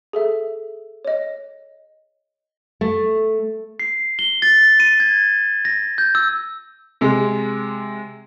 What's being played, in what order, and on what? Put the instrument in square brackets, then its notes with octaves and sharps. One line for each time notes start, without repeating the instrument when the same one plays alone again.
[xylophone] G#4 A4 E5
C#5 D#5
[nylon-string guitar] A3
[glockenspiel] C7
G7
A6
D#7
G#6
A#6
G6
E6
[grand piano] C3 G#3